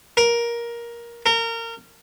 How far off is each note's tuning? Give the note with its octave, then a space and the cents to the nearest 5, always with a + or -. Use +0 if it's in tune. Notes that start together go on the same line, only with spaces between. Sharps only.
A#4 +15
A#4 -25